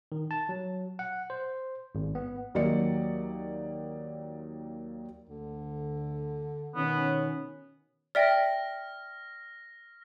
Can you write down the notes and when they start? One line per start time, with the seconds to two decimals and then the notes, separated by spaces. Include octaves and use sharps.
0.12 D#3
0.31 A5
0.49 F#3
0.99 F#5
1.30 C5
1.95 G#1
2.15 B3
2.54 D#2 F#3 A#3 D5 D#5 C#7
5.29 D2 D3
6.76 B2 D#3 B3 C#4
8.15 D5 E5 G5 F6 A#6